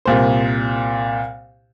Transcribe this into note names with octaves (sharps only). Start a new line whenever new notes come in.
C2 A#2 C5